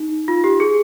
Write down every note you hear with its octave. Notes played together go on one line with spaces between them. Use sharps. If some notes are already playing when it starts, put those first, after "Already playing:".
Already playing: D#4
F4
G4
G#4